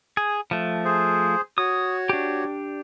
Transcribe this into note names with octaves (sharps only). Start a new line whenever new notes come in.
G#4
F3 A3
G#4 C5
F#4 C#5 D#6
D4 G4